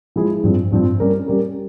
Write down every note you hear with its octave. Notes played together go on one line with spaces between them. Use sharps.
F3 G#3 E4 G#4
G2 F3 C4
G2 F3 C4
G3 C#4 G4 A#4
G3 C#4 G4 A#4